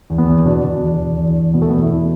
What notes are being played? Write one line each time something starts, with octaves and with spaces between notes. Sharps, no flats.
E2
B3
E2
B2 D4
B2
E2
E2
E2
E2
B2 B3
A3
E2 B3
E4
B2